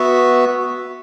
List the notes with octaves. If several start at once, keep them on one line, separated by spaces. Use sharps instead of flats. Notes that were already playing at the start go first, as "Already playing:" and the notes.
Already playing: B3 F#4 E5